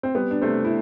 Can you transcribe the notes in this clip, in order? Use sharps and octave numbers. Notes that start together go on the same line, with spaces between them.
C4
G3 B3
D4
C3 A3 C4
E4